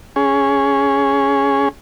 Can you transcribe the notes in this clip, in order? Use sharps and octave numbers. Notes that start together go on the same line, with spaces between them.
C#4 G#4